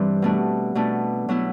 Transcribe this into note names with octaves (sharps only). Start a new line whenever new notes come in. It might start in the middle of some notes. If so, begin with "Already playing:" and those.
Already playing: G2 E3 G3 C4 G4
B2 A3 D4
B2 A3 D4
B2 F#3 B3 E4